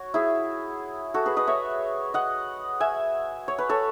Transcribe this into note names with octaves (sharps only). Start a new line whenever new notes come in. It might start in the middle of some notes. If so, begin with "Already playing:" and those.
Already playing: F#4 C#5
E4 G#4
F#4 A4
G#4 B4
B4 D#5
C#5 E5
D#5 F#5
E5 G#5
C#5
B4
A4 C#5